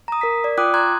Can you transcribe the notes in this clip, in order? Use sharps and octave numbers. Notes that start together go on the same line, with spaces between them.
A#5 D#6
A#4 B6
D5
F4 G5 D6 D#6 F#6
A#5 C6 D#6 F#6 G#6